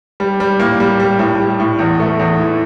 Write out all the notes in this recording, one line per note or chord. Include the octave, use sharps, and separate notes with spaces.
G3
G3
A2 A#3
G3
G3
A2
G3
A2
E2
A3
E2
E3